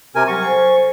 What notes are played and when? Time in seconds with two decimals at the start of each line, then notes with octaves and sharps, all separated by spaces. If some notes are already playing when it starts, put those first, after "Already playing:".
0.15 C3 A#4 G#5
0.28 F#3 G3 C#6
0.43 A4 C5 G#5